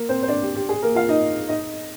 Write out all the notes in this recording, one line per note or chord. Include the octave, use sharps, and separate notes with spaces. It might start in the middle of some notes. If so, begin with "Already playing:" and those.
Already playing: A#3 A#4
C4 C5
C5
D4 D5
G4
G4
G#4
A#3 A#4
F4 F5
D#4 D#5
D#4 D#5